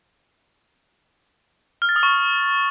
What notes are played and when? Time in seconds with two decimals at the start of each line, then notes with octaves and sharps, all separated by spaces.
1.82 F6
1.89 A6
1.96 D#6
2.03 C#6